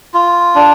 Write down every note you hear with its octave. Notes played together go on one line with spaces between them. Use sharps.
F4
D4